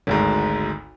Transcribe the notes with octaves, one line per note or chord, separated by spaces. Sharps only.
G#1 D2 G#2